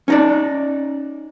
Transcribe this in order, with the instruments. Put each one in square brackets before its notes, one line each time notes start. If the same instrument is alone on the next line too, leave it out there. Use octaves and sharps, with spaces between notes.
[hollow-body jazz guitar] C#4 D#4 D5